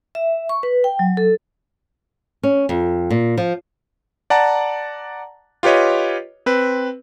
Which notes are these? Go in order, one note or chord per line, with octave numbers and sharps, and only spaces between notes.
E5
C#6
B4
G5
F#3
A4
C#4
F2
A#2
F3
D5 F#5 A5 A#5
F4 G4 B4 C#5 D#5
C4 B4